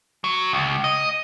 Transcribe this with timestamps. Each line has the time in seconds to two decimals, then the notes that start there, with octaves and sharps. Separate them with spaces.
0.24 F#3
0.53 C#2
0.84 D#5